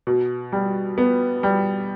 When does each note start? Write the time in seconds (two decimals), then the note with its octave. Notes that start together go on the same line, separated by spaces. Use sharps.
0.07 B2
0.52 G3
0.98 B3
1.43 G3